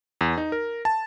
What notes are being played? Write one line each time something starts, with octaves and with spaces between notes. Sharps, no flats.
E2
D#4
A#4
A5